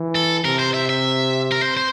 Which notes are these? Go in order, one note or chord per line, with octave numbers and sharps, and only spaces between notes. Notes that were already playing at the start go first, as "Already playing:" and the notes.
Already playing: E3
A4
C3 A#4
C5
E5
E5
A#4
C5
C5